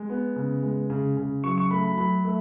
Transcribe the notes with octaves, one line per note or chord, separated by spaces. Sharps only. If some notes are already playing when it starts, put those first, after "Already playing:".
Already playing: G#3
B3
C#3
G#3
C#3
C#3
F#3 C#6
C#6
A3 B5
B5
F#3 B5
A3